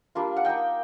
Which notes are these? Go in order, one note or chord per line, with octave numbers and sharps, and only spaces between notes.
G3 A#3 D4 F4
F#5
A#3 D#4 G5